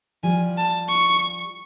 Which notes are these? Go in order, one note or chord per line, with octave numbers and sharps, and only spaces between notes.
F3 G3 G#5
A5
C#6